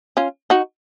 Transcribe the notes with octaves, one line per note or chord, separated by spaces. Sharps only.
C#4 F4
D#4 F#4